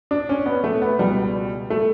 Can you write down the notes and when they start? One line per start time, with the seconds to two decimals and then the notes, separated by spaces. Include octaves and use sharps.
0.11 D4
0.29 C#4
0.46 B3
0.64 A3
0.82 B3
0.99 C#2 B2 G3
1.70 A3